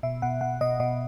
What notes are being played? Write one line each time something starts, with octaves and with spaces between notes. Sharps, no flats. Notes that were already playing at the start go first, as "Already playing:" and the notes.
B2 E5
B2 F#5
B2 F#5
B2 D#5
B2 D#5